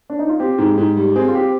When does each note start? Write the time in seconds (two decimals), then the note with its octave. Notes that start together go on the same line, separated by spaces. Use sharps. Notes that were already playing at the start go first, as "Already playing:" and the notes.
0.10 D4
0.19 D#4
0.29 F4
0.40 C4 G4
0.58 G#2
0.78 G#2
0.97 G3
1.16 C4 G#4
1.28 F4
1.35 G4